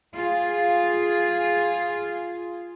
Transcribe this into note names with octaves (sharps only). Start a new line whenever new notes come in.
F4 G#4